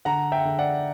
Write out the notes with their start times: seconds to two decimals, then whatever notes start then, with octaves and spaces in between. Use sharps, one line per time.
0.05 D3 F#5 A#5
0.32 E5 G5
0.45 D3
0.58 D5 F#5